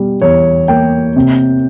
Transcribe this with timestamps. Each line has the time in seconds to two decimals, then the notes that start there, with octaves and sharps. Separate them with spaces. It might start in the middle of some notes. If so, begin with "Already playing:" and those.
Already playing: B2 G3
0.22 E2 C#5
0.68 A#3 G5
1.16 C3